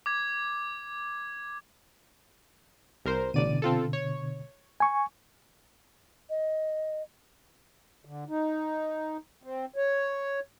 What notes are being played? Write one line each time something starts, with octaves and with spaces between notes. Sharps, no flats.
D6 G#6
C2 A#4 C5
A1 B2 D3 D5 D#7
C4 F4 A4
C#5
G#5 C#6
D#5
D3
D#4
C4
C#5